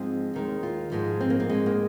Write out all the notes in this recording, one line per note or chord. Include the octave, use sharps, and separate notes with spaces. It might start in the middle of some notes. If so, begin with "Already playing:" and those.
Already playing: G#2 F3 G#3 C4
D#2 D#3 G#3
F4
G#2 F3 G#3
C4
A#3
C4
G#2 G#3
A#3